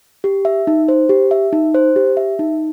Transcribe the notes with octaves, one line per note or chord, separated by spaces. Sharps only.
G4
E5
D#4
C5
G4
E5
D#4
C5
G4
E5
D#4